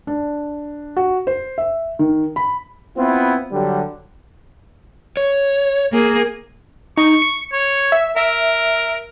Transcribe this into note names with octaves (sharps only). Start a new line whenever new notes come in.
D4
F#4
C5
E5
D#3
B5
B3 C4 E4 F4
D3 F#3 G3
C#5
A#3 G#4
D#4 C#6
C#7
C#5
E5
A#4 E5